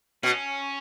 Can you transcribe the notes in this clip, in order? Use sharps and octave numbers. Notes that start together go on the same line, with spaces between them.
B2 C#4